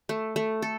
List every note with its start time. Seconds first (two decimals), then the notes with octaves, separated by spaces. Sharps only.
0.09 A3
0.36 A3
0.62 A4